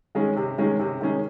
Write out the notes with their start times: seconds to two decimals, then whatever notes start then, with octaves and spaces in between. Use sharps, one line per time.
0.15 D#3 G#3 C#4 G#4
0.36 C3
0.58 D#3 G#3 C#4 G#4
0.79 C3
1.01 D#3 G#3 C#4 G#4